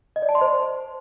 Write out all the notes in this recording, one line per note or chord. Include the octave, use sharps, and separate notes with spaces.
D#5
D5
A5
C6
C5